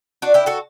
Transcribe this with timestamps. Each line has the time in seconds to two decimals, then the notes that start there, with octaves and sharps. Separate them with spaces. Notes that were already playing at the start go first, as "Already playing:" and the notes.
0.22 D4 F#4
0.34 E4 G4
0.46 F#4 A4